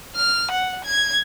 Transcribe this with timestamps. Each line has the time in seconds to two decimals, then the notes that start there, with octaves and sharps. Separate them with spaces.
0.16 F6
0.52 F#5
0.85 G#6